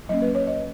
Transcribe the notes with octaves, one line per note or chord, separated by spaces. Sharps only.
F#3 A#3 C#4 D#5
B4
C#5
D#5